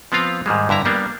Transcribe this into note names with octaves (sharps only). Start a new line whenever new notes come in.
F3 B3 C4 F4 F5
G#2 D#3 G3 G#3
G2 D3 E4 A#5
G3 A#3 B3 D4